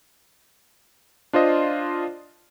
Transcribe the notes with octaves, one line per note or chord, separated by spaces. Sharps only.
D4 F4 C5 D#5